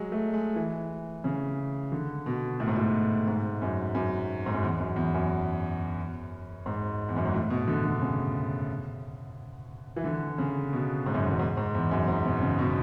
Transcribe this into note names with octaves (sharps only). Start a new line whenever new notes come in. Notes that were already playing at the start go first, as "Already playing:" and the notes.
Already playing: F#3 G#3
A3
G#3
E3
C#3
D3
B2
A2
G#2
A2
G#2
F#2
F#2
G#2
F#2
E2
F#2
E2
F#2
G#2
E2
F#2
G#2
A2
B2
D3
D3
C#3
E3
D3
C#3
B2
G#2
F#2
E2
F#2
G#2
G#2
E2
F#2
G#2
B2
C#3
B2